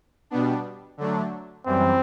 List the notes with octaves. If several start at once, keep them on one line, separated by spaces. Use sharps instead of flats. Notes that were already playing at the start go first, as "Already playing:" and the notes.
B2 G3 B3 D4
D3 F#3 A3 D4
F#2 E3 G3 C4